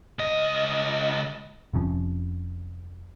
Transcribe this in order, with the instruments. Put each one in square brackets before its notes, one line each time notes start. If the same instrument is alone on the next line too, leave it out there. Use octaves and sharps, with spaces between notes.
[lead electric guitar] C#2 D#5
[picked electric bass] F1 C3 F3 C#4